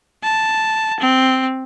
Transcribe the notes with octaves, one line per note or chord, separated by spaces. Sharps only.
A5
C4